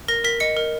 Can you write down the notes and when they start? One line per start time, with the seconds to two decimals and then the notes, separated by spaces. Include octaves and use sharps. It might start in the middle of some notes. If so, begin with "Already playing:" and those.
0.08 A#4 A#6
0.24 A#4 B6
0.40 D#5 C#7
0.57 A#4